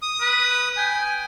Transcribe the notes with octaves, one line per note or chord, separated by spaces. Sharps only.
D#6
B4
G5 G#5